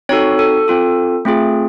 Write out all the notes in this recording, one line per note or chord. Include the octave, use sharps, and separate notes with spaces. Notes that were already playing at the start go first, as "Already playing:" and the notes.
C4 D#4 F#4 A4 C#5
A4
C4 F4 A4
A3 C4 F4 G#4